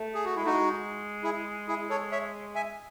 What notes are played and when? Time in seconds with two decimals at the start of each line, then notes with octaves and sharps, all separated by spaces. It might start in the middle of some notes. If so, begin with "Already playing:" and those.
Already playing: A3
0.15 G#4
0.25 F#4
0.36 G#3 E4
0.44 A3 D#4 F#4
0.52 G#3
1.23 E4 G#4
1.68 E4 G#4
1.89 A4 C#5
2.12 C#5 E5
2.55 E5 G#5